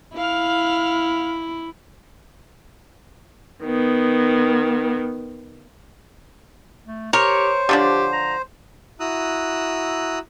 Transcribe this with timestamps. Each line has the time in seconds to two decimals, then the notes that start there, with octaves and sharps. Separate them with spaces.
0.16 E4 F5 F6
3.63 D#3 B3
6.88 A3
7.13 G4 A#4 C5 C#5
7.69 D3 F3 D4 G4
8.13 A#5
9.00 E4 F#4 A#5 D#6 E6 F#6